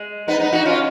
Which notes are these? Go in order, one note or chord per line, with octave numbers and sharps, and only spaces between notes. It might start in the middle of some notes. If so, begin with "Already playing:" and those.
Already playing: G#3
B3 D#4
B3 D#4
D#4 F#4
C#4 F4